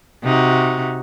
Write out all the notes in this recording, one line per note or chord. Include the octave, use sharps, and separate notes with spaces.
C3 D#4 F#4